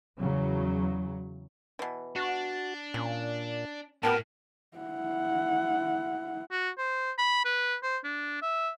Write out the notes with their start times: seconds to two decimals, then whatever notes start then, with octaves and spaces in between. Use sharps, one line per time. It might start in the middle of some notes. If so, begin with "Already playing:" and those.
0.17 E2 C#3 F#3
1.79 B2 E3
2.16 D4 F#4
2.94 A#2 C#4
4.03 A2 B3 F#4 G4 A#4 A5
4.78 E4 F#5
6.51 F#4
6.78 C5
7.18 B5
7.45 B4
7.83 C5
8.04 D4
8.42 E5